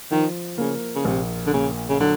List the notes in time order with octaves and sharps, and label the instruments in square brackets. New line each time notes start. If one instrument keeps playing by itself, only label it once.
[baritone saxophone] D#3 [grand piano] F3
[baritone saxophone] C#3 [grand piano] A#3
[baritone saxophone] C#3
[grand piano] A#1 [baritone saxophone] C3
[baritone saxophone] D3
[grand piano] A#2 [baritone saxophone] C#3
[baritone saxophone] C#3
[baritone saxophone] D3 [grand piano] F#3